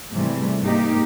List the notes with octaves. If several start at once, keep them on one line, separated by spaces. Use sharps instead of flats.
G#2 C3 E3 G3 A3
G#2 A#3 D#4 G4